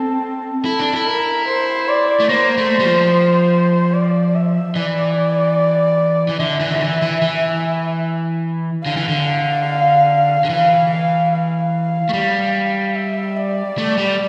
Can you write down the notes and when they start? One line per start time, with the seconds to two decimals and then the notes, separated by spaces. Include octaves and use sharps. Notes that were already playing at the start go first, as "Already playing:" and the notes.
Already playing: C4 A4
0.65 E4 A4
0.79 D4
0.93 E4
1.07 A#4
1.48 C5
1.89 D5
2.20 A3
2.29 A#3 C5
2.58 A3
2.79 G3
2.85 F3
3.94 D5
4.35 E5
4.76 E3 D5
6.29 E3
6.40 D3 E5
6.60 E3
6.71 D3
6.81 E3
7.02 E3
7.22 E3
8.85 D3 F5
8.97 E3
9.09 D3
10.45 D3
10.50 E3 F5
10.91 F5
11.32 F5
12.09 A3
12.13 G3
12.95 E5
13.37 D5
13.78 A3
13.98 G3